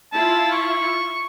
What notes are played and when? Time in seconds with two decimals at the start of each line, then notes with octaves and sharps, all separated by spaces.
0.12 E4 F4 A5
0.52 C#6